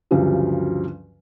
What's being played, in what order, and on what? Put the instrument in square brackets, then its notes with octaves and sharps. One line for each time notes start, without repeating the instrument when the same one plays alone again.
[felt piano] D2 G2 C#3 F3 F#3